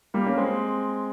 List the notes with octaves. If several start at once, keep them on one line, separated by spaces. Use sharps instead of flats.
G3 A#3
A#3 C#4
G#3 C4